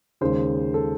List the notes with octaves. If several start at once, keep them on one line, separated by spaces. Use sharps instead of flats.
D#2 C#3 G#3 C5
A4